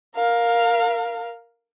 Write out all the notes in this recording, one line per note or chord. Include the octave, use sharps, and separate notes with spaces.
A#4 F5